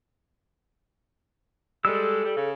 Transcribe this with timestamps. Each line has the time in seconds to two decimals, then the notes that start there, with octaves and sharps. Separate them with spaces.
1.85 G3 G#3 A4 E6
2.24 G3
2.36 C#3